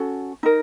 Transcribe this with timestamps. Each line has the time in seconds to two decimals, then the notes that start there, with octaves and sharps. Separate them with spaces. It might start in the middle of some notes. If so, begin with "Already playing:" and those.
Already playing: C#4 F#4 A4
0.43 D#4 A#4